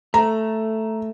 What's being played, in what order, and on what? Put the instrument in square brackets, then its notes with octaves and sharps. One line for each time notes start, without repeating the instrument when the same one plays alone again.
[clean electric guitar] A3 [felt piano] A#5